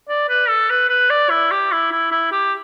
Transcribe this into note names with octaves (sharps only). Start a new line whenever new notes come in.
D5
B4
A4
B4
B4
D5
E4
G4
E4
E4
E4
G4